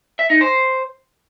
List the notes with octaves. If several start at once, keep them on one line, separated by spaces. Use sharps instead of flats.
E5
D#4
C5